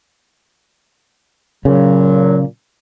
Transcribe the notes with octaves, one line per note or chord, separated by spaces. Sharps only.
A#2 C#3 F#3